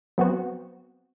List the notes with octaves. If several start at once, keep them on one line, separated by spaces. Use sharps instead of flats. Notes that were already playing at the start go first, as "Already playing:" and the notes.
F#3 B3 C4 F#4